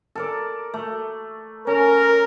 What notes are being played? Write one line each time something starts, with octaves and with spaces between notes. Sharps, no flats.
A4 A#4 D5
A3
C#4 A#4